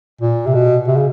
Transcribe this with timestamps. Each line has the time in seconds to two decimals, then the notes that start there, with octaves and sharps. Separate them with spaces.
0.21 A#2
0.46 C3
0.55 B2
0.88 C3
0.97 C#3